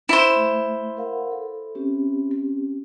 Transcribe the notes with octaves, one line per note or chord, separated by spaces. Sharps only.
E4 C5
A3
A#4 F5 F#5
A4
C4 C#4 G4